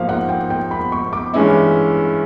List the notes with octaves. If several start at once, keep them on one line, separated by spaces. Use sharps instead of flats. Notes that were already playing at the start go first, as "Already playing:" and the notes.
Already playing: G#2 F3 A#3 D#4 F5
F#5
G5
G5
B5
C#6
D6
G2 E3 G#3 C#4 E4